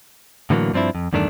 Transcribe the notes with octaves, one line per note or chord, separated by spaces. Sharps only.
A2 D3 E3 F#3 A#3
G2 F3 C4 D4 E4
F2
E2 G2 D#3 A3 D4